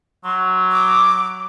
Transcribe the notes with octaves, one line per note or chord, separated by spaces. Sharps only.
F#3 C6
D6